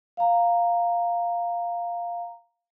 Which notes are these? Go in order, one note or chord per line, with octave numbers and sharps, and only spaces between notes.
F5 A#5